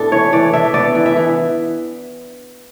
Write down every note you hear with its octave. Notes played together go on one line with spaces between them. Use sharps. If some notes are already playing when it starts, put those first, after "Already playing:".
Already playing: A2 B3 D4 A4
E3 C#5
E3 D5
D4 E5
B3 D5
E3
E5
E3